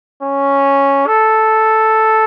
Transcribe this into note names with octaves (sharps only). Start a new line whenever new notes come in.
C#4
A4